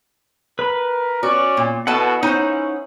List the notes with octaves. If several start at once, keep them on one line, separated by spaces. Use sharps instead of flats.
A#4 B4 B5
C#4 F#4 D5
A#2
B2 E4 A4 B4 F#5 A5
C#4 D#4 C5